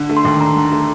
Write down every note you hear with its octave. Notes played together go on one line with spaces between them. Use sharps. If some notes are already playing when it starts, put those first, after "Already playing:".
Already playing: D3
A3
C6
D#2
C6
D4 A#5
D3
A3